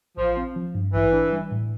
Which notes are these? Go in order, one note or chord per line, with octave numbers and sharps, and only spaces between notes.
A1 F3
C4
F3
G2
A1 E3
D4
G3
A2